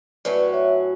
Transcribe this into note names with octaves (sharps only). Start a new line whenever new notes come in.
A2 F#3 C#4 F#4 B4 D5
C#5 E5